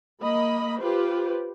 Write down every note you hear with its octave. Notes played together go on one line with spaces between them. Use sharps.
A#3 D#5 B5
F4 G4 B4 C5